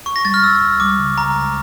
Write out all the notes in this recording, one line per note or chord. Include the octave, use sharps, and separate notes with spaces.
C#2 C#6
A#6
G3 A6
F6
C#2 E6
C#2
G3 D6
C#3
C#2 A#5
C#2